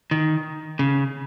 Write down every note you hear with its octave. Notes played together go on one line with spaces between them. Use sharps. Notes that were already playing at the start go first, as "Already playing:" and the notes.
D#3
C#3